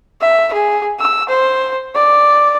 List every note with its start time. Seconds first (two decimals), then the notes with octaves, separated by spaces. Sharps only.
0.21 E5
0.53 G#4
1.00 E6
1.29 C5
1.95 D5